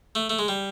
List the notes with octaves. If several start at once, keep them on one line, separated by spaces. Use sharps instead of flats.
A3
A3
G#3
G3